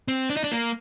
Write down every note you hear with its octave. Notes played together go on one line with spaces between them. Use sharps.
C4
D4
D#4
D4
A#3